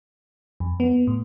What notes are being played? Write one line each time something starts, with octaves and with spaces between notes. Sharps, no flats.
F2
B3
A2